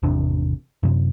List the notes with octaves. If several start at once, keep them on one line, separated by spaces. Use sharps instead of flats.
G#1 E2 C3 D4
F#2 C3